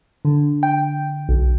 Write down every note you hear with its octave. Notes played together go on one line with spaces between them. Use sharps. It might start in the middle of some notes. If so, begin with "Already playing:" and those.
D3
G5
B1